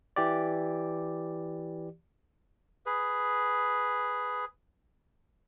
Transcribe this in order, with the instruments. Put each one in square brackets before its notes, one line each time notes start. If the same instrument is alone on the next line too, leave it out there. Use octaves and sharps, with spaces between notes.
[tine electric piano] E3 G4 D5
[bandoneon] G#4 B4